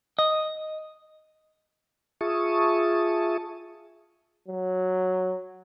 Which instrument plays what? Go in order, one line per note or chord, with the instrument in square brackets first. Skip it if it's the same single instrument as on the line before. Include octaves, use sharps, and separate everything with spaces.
[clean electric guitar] D#5
[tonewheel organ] F4 G#4 E5 A5 C#6 D#6
[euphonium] F#3